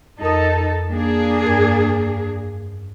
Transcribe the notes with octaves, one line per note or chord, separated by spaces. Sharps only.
F2 D#4 A4 A#4 D#6
A#3 D4 G#4
G2 A#4 G#6